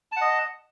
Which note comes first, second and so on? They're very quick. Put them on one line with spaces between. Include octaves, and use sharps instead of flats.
A5 F#5 D#5